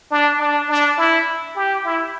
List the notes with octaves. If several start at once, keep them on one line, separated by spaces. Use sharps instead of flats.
D4
D4
D4
E4
G4
E4